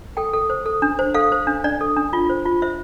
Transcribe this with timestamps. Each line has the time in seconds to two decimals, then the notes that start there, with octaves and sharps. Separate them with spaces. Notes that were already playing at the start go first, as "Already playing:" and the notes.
0.17 A4 G5
0.33 A4
0.50 C5
0.66 A4
0.82 D4
0.99 C5
1.14 A4 F5
1.32 C5
1.47 D4
1.64 D4 D5
1.81 A4
1.97 D4
2.13 F4
2.30 C5
2.46 F4
2.62 C5 E5